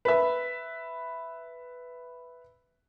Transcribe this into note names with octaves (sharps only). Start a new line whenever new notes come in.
B4 E5